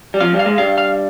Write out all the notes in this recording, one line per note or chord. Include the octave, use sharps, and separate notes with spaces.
G3
F2 F3 F5
G2 G3
F5
G#2 G#3
G2 G3 F5
F5